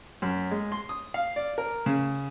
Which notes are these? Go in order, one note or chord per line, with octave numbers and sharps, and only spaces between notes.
F#2
G#3
C6
D#6
F5
D5
A#4
C#3